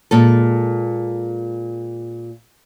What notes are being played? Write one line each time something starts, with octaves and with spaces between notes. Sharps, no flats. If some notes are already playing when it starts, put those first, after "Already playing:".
A#2 G#3 A4